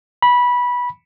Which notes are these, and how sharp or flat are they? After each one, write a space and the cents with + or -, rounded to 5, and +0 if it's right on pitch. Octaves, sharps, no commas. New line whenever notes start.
B5 -15